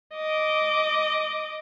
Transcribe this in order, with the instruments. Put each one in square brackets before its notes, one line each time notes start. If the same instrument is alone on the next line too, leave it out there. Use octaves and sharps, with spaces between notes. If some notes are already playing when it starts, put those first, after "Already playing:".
[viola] D#5 D6